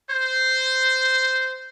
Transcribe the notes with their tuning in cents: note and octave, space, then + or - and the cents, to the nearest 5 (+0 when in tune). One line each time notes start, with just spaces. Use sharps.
C5 -10